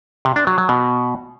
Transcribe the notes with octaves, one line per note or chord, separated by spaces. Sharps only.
C3
D4
F#3
F#3
B2